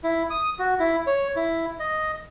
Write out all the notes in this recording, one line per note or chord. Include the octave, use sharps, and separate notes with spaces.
E4
D#6
F#4
E4
C#5
E4
D#5